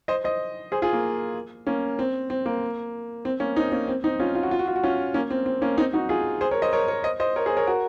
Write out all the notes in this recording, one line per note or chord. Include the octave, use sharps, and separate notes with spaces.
C5 D#5
C5 D#5
G#4 C5
F4 G#4
A#3
A#3 C#4
C4
C4
A#3
C4
A#3 C#4
C4 D#4
A#3 C#4
C4
C4 D#4
C#4 F4
F4
F#4
F4
F#4
F4
F#4
C#4 F4
A#3 C#4
C4
C4
A#3 C#4
C4 D#4
D#4 F#4
F4 G#4
G#4 C5
A#4 C#5
C5 D#5
A#4 C#5
A#4 C#5
C5 D#5
C5 D#5
A#4 C#5
G#4 C5
A#4 C#5
F#4 A#4